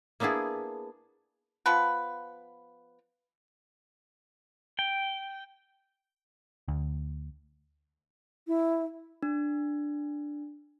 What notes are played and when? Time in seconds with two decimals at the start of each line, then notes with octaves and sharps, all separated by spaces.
0.20 A#3 B3 D4 E4 G#4
1.66 F3 B3 B4
4.79 G5
6.68 D2
8.47 E4
9.23 D4